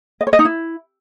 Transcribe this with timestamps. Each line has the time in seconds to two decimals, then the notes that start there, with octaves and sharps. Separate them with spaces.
0.21 D#5
0.27 C#5
0.33 D#5
0.39 D#4
0.45 E4